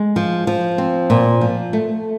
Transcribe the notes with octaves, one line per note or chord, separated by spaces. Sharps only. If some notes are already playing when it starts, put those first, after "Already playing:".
Already playing: G#3
F3
F3
C4
A#2
F3
A3